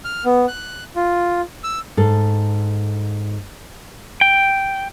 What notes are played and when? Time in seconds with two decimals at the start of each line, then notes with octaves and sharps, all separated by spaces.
0.05 F6
0.25 B3
0.48 F#6
0.96 F4
1.64 E6
1.97 G#2 A4
4.21 G5